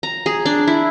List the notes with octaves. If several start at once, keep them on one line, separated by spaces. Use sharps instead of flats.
A#5
G#4
D4
E4